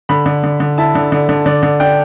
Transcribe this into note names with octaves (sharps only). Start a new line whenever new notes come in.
D3 B5
D3
D3
D3
E4 A5
D3
D3
D3
D3 D5
D3
D4 G5